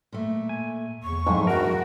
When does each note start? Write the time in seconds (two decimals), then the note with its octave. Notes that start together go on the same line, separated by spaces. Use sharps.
0.12 A#2 A3
0.49 G#5
1.03 E2 C#6
1.27 F2 G#2 F#3 G#3 C4 E4
1.47 G2 F#4 A#4